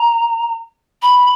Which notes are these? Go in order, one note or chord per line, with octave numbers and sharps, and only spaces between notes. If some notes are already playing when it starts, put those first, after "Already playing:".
Already playing: A#5
B5